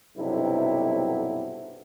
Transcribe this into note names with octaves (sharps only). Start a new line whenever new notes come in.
B1 G2 C3 F#3 E4 A4